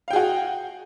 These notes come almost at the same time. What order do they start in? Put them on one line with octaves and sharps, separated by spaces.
F5 G5 G#4 F#4